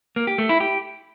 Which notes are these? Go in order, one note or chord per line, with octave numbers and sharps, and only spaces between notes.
A#3
G4
A3
E4
G4